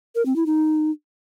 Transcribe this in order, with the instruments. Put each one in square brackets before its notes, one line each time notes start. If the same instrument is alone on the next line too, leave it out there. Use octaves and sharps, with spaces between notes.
[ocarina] A#4
C4
E4
D#4